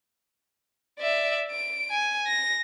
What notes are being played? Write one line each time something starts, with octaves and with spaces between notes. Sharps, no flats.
D5 E5
D7
G#5
A#6